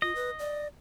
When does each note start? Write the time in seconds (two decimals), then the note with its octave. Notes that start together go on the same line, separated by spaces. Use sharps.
0.02 F4 D#5
0.15 B4
0.39 D5